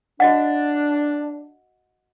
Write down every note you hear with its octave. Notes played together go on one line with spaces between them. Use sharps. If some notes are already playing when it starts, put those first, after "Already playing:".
D4 F#4 D#5 F#5